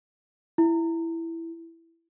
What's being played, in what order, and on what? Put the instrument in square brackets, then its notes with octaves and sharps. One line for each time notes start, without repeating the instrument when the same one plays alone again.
[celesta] E4